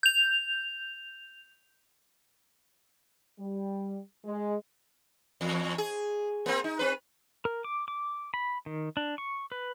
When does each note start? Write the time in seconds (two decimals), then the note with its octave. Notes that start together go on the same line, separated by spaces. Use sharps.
0.03 G6 F7
3.39 G3
4.25 G#3
5.41 E2
5.78 G#4
6.46 A#3 C4
6.64 D#4
6.79 C4 B4
7.45 A#4
7.64 D6
7.88 D6
8.34 B5
8.66 D#3
8.97 D4
9.18 C#6
9.52 B4